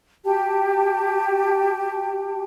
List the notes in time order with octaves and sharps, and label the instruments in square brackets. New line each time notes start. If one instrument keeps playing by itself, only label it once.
[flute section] F#4 G4 G5 A5